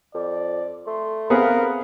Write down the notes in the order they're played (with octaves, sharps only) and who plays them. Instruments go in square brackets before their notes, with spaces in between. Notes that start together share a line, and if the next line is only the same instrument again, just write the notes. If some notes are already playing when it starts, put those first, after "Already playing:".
[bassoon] F2 [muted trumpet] D5
[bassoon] A3 [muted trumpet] C6
[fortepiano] B3 C4 G#4 [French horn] A#4 [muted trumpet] F5